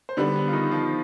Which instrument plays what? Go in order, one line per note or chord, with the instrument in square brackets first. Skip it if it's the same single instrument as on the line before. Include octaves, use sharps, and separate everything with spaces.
[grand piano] C5
[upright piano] D3 G3 D4 [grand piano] B3 B4
[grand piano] B3 B4
F4
D#3 D#4
F3 F4